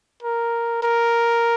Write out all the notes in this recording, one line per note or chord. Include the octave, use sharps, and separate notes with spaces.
A#4
A#4